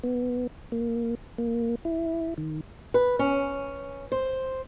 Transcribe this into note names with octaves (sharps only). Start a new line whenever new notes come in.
B3
A#3
A#3
E4
D#3
B4
C#4
C5